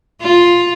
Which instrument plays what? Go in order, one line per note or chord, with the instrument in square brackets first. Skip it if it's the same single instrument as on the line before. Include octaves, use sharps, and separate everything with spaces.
[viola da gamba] F4